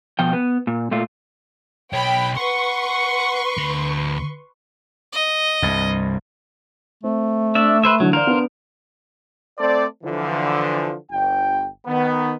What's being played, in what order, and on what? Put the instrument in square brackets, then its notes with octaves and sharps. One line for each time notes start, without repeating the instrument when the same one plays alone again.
[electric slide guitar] B2 F3 G5
B3
A#2
A#2 A3 F4
[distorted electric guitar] B1 C#5 [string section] G5 B5
[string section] B4 C6 C#6 [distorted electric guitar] F#5
[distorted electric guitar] D2 B5
[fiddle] D#5
[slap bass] C2 G2
[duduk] A3 [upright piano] C4
[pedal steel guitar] D4 D5 E5
B4 C5 E5
[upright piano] D3 E3 [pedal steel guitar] F#3
[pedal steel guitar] A#4 C5 F5 [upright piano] D5 A#5
[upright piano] B3 D4
[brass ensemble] A3 C4 A4 C5 D5
D3 E3 F3
G1 G5
D#3 B3